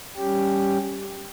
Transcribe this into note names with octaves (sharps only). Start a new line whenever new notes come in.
G3 C#4 G4